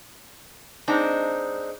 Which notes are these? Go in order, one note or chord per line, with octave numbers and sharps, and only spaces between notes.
G#3 C4 D4 D#4